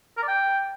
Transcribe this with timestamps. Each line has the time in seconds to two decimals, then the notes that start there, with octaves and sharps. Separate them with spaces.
0.17 A#4
0.23 D5
0.28 G5